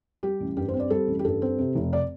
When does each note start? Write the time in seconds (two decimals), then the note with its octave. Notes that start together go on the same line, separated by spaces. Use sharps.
0.23 G3 G4
0.40 A1
0.57 G2 G4
0.68 C5
0.74 C4
0.80 D5
0.90 G3 A4
1.08 A1
1.19 G4
1.25 G2 A4
1.42 C4
1.58 C3
1.75 F1
1.93 D5